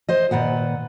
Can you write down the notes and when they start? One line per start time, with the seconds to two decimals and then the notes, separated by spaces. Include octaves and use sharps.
0.09 C5 D#5
0.31 A#2 D#3 B4 F#5